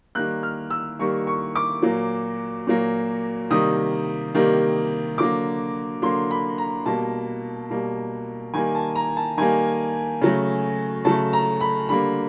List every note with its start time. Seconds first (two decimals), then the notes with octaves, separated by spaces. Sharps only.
0.15 D#3 G3 A#3 F#6
0.43 F6
0.70 E6
0.99 D#3 G3 A#3 C#6
1.27 C#6
1.55 D6
1.82 A#2 F#3 A#3
2.67 A#2 F#3 A#3
3.51 C3 D#3 G3 A#3 D#6
4.35 C3 D#3 G3 A#3
5.18 D3 F#3 A#3 D6
6.02 D3 F#3 A#3 C6
6.31 B5
6.58 A#5
6.86 B2 G3 A#3 A5
7.70 B2 G3 A#3
8.54 D#3 G3 A#3 G#5
8.75 A5
8.95 A#5
9.17 A5
9.37 D#3 G3 A#3 G#5
10.21 C#3 F#3 A3
11.05 C#3 F#3 A3 A5
11.33 A#5
11.61 B5
11.89 D3 G3 A#3 B5